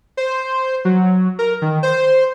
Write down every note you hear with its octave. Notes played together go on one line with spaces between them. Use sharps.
C5
F#3
A#4
D#3
C5